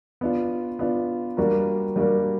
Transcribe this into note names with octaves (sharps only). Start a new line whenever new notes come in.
B3 D4 F4
B3 D4 F4
G3 A#3 D4 F#4 A#4
G3 A#3 D4 F#4 A#4